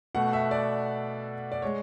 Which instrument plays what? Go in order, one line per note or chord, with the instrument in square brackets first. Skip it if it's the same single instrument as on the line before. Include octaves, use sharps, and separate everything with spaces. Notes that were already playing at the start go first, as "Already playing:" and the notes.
[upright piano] B2 A3 F#5
E5
D5
D5
G#3 C#5